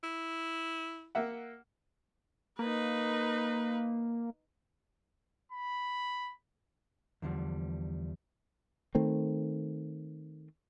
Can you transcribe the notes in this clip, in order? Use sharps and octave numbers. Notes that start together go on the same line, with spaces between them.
E4
A#3 E5 F#5
A#3 D#4 B4
B5
E2 D3 F3 G3
D#3 A3 C4